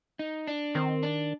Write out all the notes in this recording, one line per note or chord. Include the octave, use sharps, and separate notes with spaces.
D#4
D4
D#3 C4
D4